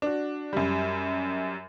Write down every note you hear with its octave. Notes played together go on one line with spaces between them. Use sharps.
D4 F#4
F#2 G3